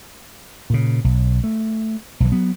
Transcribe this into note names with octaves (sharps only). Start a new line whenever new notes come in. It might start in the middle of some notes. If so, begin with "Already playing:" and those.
A#2 C#3
B1
A3
B1 E3
F#3 B3